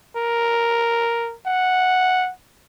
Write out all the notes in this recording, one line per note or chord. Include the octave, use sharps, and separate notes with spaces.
A#4
F#5